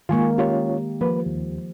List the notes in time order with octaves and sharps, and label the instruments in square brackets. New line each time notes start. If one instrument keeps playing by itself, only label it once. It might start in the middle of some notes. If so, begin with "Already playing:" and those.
[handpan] D#3 G#3 A#3 [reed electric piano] F4 G#5 C#6
[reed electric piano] C#4 F4 C#5 [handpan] G4
[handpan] F3 [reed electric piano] A#3 B4
[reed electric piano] D#2